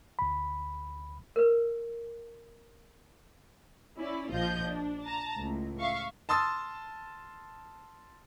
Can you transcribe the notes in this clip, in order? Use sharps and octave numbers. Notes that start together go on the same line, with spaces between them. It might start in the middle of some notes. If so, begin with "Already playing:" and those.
D2 B5
A#4 B4
C#4 E4 D5
A#1 F3 F4 D#5 G6
D4
A5 A#5
C#2 A2
E5 F5 C#6
A5 C6 D#6 E6 A6